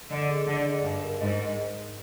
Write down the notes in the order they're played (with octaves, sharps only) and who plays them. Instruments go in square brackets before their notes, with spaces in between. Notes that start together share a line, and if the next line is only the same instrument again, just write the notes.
[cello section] D3 [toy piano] D#5
[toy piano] G#4
[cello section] D3 [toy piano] D#5
[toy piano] G#4
[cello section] G2 [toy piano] D#4
[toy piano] A#4
[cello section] G#2 [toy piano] D#5